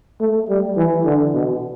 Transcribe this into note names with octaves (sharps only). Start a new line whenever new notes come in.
A3
G3
E3
D3
B2